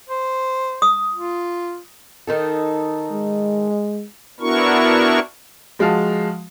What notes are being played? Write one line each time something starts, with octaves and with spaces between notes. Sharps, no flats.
C5
D#6
F4
D#3 D#4 A4
G#3
B3 D4 E4 F#4 A#4 C#6
F3 G#3 F#4 F5 A5